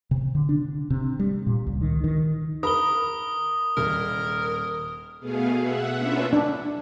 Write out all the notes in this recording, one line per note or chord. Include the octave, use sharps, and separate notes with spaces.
C3
D3
D4
C3
G3
A#2
C#2
D#3
D#3
A#4 B5 D#6 G7
D#1 A#4
B2 A3 B3 G#4 F5
E5 F#5
A#3 C#4 D4 F4 B4 E5
D4